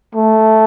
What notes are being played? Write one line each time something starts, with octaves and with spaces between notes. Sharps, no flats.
A3